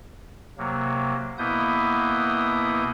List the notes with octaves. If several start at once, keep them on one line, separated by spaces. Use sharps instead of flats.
C3 F#3 A#3
B2 A#3 B3 E4 D#6 G6